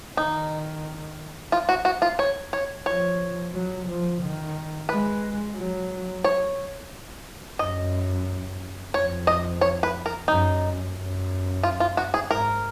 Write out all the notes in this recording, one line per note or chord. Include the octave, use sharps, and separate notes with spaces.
D#3 D#4
F4
F#4
F#4
F4
C#5
C#5
F3 C#5
F#3
F3
D#3
G#3 B4
F#3
C#5
F#2 D#5
F2 C#5
D#5
C#5
B4
A#4
F#2 D#4
F#2
F4
F4
F#4
G#4
G#2 A#4